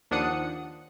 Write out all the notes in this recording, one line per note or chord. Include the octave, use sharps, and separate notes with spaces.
D#2 F3 D4 F#5 D#6 C#7